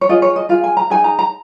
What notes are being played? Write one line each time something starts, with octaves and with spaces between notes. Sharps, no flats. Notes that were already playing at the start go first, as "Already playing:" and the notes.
C#5
F4 G#4 D#5
C#5
D#5
F4 G#4 F5
G#5
A#5
D#4 G#4 G#5
A#5
A#5